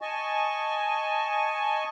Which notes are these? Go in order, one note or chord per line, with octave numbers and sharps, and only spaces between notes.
D#5 G#5 A5 C#6